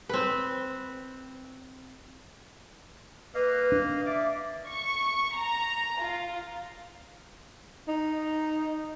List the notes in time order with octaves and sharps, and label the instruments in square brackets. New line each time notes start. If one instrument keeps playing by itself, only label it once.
[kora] C4 B4
[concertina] A#3 D#5 F5 [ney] B4
[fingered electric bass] D4
[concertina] D5 D6 [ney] E5
[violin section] C#6
A#5
F4
[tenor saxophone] D#4